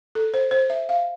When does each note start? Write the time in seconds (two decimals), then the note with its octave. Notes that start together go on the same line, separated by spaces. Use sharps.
0.15 A4
0.34 C5
0.51 C5
0.70 E5
0.89 F5